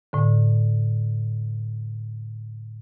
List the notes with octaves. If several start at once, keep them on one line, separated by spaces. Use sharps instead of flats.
A2 D3